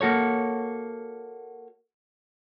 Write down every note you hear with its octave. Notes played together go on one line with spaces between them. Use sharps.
A#3 F#4 A4 C#5